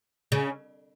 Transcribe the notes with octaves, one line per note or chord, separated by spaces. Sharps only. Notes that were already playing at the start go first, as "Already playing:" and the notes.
C#3